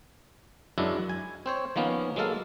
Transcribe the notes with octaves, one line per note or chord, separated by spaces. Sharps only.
F#2 F#3 G#3 D4 E4
G#5
C4 C5 C#5
D#3 F3 A#3 B3 C#4
F#3 G#3 A#3 A4 F5